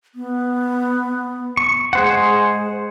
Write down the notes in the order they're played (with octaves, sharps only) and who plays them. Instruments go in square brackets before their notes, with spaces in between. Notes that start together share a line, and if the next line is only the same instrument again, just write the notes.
[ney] B3
[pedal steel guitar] C#6
[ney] G#3 [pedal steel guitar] G#4 C5 F#5